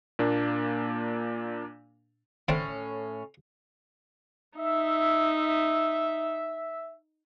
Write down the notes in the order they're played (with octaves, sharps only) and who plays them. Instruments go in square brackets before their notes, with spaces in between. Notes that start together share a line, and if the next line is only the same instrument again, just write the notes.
[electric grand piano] A#2 A#3 D4
[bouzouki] A2 C#4 [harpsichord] D3 A3 C4
[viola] D#4 [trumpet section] E5